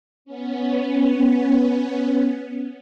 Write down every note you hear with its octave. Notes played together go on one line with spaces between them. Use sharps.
B3 C#4